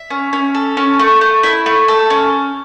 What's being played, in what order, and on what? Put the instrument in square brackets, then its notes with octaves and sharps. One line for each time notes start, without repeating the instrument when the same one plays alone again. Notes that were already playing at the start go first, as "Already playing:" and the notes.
Already playing: [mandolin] E5
C#4
C#4
A4
C#4
A3
A3
E4
A3
A4
C#4